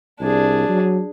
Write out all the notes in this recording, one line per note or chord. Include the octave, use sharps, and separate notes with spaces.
C2 D4 G#4
F#3